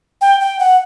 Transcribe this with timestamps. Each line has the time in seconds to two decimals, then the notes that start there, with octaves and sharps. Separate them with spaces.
0.21 G5
0.40 G5
0.59 F#5